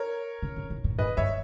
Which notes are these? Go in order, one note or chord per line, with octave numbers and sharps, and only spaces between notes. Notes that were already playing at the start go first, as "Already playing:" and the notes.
Already playing: A#4 C#5
C#3
C#3
B2
A#2
G#2 B4 D#5
G2 C#5 E5